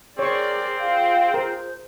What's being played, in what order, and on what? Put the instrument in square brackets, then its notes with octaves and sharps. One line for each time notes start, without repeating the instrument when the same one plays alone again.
[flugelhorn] C4 [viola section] G#4 A#4 D5 [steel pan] C#5 C#6
[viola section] F4 G#4 [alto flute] F5
[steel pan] A#4 [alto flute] C5